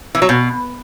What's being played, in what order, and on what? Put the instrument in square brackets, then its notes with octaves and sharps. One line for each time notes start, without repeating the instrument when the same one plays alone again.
[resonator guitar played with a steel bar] E3
F#3
B2